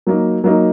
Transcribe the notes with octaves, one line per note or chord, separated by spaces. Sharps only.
F#3 A#3 D#4
F#3 A#3 D#4